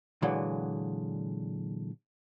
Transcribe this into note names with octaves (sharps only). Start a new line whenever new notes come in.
A#2 D3 E3 F#3 G#3